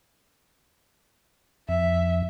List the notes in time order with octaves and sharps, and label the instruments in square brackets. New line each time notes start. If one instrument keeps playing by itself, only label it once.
[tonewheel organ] F2 [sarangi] E5